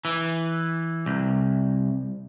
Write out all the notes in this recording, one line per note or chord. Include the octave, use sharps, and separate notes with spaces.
E3
C2